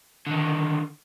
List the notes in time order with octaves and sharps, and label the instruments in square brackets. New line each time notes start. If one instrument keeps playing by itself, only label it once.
[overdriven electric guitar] D3 D#3